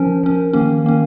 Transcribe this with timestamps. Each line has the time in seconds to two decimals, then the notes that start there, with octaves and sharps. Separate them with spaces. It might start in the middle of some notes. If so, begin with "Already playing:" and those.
Already playing: F3 C#4 A#4
0.23 F3 C#4
0.53 D#3 A#3 C#4
0.85 D#3 A#3 C#4